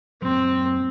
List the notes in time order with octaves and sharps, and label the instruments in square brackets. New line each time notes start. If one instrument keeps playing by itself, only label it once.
[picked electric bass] F#2 A#2 F#3 [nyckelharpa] C4